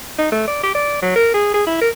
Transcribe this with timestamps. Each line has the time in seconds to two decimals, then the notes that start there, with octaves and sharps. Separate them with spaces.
0.19 D#4
0.32 A3
0.48 D5
0.63 G4
0.75 D5
1.02 F#3
1.16 A#4
1.34 G#4
1.54 G#4
1.67 E4
1.81 A#4